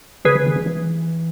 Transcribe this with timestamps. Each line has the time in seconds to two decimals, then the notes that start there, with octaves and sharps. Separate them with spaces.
0.25 C#3 G#4 B4
0.35 C#3
0.46 D#3
0.56 E3
0.66 E3